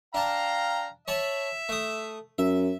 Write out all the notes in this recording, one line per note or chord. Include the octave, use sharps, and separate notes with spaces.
D4 F5 G5 A5 A#5
C#5 E5 A5 B5
A3 D#6
F#2 E5